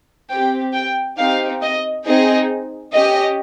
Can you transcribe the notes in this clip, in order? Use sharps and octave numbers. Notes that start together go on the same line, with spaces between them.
C4 G4 G5
G5
C4 D#4 G4 F5
D#5
C4 D#4 G#4 D#5
C#4 G4 D#5